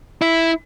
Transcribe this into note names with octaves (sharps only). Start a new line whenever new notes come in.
E4